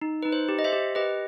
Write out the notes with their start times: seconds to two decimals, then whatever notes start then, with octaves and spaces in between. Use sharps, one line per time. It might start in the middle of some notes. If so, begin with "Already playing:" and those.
0.02 D#4
0.23 D#4 B4
0.33 C5
0.49 G4
0.59 D#5
0.64 C5 E5
0.73 G4
0.95 G4 B4 D#5